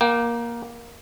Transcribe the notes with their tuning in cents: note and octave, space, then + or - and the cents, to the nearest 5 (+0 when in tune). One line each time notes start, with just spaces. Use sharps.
A#3 +15 G5 -25